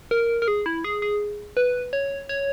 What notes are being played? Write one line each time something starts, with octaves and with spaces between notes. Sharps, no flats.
A#4
A#4
G#4
E4
G#4
G#4
B4
C#5
C#5